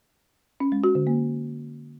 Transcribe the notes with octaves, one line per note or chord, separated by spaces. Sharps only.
C#4
G#3
F#4
D3
A#3